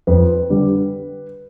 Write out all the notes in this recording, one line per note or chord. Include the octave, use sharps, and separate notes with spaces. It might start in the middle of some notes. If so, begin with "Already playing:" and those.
F2 B4
D3 G3